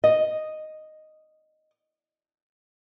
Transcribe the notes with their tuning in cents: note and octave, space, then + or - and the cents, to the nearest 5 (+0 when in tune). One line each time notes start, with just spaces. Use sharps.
D#5 -5